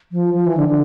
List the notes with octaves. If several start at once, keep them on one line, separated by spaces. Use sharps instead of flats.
F3
F3
E3
D3
D3